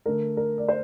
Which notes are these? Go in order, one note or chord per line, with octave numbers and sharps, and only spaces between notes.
D3 A3 A#4
A#4
D5
C5